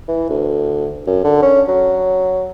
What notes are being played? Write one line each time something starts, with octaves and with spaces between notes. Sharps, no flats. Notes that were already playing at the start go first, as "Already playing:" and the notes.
E3
D2
F#2
D3
C#4
F#3